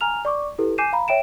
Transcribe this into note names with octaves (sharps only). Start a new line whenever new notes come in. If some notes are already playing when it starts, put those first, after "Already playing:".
G#5 A#5 F6 F7
D5 C#6 D6
E4 G4 A4 B4
G#5 D6 G6 C7 D#7 E7
F5 A#5 B5
C#5 E5 G5 D7 E7